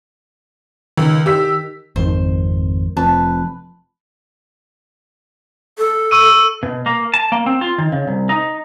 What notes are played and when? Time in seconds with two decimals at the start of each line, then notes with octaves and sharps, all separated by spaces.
0.97 C#2 D#3
1.26 G4 E6 B6
1.96 G#1 F2 D#3 C5
2.97 F1 F2 B4 A5
5.78 A4
6.11 C#6 E6 D#7
6.63 B2
6.86 A#3
7.14 A5
7.32 A#3
7.46 C4
7.61 F4
7.78 D#3
7.92 C#3
8.07 C2
8.29 D#4